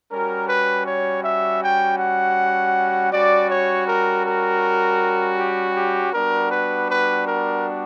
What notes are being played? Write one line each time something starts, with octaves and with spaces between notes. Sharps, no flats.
G3 C#4 F#4 A#4
B4
C#5
E5
G5
F#5
G3 C#4 F#4 D5
C#5
A#4
A#4
G4
G4
G3 B3 D4 F#4 A#4
B4
B4
A#4